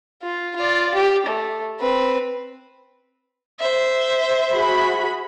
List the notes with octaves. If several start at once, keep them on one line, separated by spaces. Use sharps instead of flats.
F4
F4 D5
G4
A3
C4 B4
C5 E5
F#4 G#4 B5